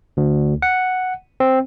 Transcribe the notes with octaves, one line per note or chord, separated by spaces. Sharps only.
D2
F#5
C4